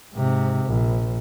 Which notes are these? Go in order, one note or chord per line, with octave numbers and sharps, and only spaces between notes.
G#2 C3
A#1